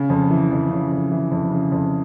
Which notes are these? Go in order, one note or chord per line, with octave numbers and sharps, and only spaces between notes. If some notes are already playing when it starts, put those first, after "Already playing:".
Already playing: C#3
F2
E3
F2
C#3
F2
E3
F2
C#3
F2